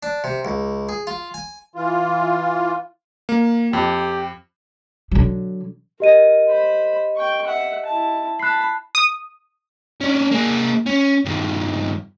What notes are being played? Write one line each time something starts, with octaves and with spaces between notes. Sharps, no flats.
D4
C3
C#2
G#4
F4
G#5
E3 F4
A#3
F2 G4
D3 F#3
G4 A#4 D#5 D#7
C5 B5
G5 C#6
E5 F#5
E4 A5
A5 B5 F#6 C7
D#6
C#4 D4
A#3 G#4
C#4
G2 D#3